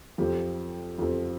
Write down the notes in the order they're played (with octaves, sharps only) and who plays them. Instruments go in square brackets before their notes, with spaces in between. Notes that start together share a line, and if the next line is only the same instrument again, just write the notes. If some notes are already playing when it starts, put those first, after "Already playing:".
[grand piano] F2 F3 C4 G4
F2 F3 C4 G4